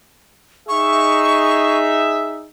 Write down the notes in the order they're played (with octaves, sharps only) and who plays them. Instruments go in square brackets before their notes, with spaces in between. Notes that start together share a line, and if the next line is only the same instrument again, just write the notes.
[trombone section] D#4 G#4 [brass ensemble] E5 [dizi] C#6